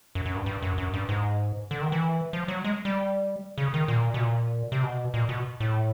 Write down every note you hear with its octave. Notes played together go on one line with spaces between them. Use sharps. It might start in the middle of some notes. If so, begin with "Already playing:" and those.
F#2
F#2
G2
G2
F#2
F#2
G2
G#2
D3
D#3
E3
F3
F#3
G#3
G3
C#3
D#3
A#2
B2
A#2
C3
B2
A#2
B2
A2